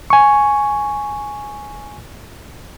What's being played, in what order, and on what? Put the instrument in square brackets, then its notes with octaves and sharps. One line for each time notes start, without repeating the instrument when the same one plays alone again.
[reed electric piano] G#5 C#6